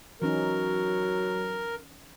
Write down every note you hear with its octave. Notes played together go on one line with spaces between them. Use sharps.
E3 F#3 C#4 D#4 A#4